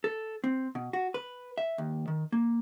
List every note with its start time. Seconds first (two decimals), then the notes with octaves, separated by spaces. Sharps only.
0.04 A4
0.44 C4
0.75 B2
0.93 F#4
1.14 B4
1.58 E5
1.78 D#2
2.08 D#3
2.32 A#3